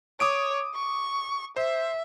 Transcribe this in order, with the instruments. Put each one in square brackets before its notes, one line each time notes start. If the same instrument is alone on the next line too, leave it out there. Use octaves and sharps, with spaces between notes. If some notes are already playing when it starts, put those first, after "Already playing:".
[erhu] C#5 [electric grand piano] D6 D#6 D7
[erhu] C#6
[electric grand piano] C5 [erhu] E5